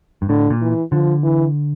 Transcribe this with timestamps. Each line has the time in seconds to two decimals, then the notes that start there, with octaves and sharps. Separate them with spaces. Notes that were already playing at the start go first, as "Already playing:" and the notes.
0.22 G2
0.29 A2 D3
0.50 A#2
0.61 E3
0.91 D3 F3
1.23 E3